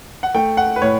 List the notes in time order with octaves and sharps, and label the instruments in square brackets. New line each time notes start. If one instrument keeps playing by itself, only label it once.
[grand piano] F#5
A3 G5
F#5
B4
A2 C#5